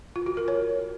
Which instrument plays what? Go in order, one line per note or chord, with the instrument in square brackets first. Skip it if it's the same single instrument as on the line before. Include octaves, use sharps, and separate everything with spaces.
[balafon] F4
F#4
A#4
C#5